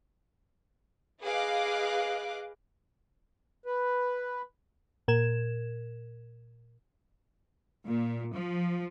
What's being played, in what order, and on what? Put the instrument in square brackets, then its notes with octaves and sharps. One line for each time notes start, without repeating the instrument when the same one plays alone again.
[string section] G#4 B4 D#5 F5 D6 F#6
[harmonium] B4
[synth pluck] A#2 A#4 G#6 E7
[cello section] A#2
F3